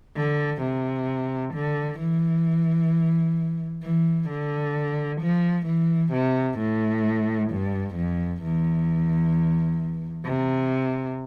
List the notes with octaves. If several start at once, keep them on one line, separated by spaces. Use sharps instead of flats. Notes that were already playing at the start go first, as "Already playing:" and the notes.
D3
C3
D3
E3
E3
D3
F3
E3
C3
A2
G2
F2
E2
C3